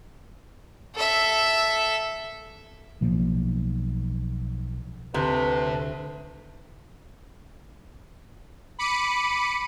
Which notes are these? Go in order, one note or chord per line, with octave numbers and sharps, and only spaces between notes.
A4 E5
B1 A2 F3 A#3
D2 C3 E4 A4 B4
B5 D6 C#7 D#7